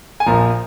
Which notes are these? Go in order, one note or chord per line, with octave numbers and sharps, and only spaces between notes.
G#5
A#1 A#2 F3 A#5